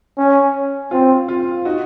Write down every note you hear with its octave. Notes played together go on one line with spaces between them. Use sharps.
C#4
C4 F4
F4
D#4 F#4